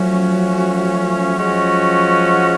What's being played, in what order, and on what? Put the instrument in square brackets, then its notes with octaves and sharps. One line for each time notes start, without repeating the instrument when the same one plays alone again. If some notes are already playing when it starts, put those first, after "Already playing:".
Already playing: [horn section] F3 A3 C#4 F#4 [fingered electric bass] F#3
[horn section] F3 G#3 C#4 F#4